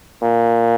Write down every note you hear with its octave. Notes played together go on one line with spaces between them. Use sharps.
A#2